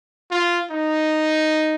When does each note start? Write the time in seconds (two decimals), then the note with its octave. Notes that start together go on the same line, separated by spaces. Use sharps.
0.31 F4
0.71 D#4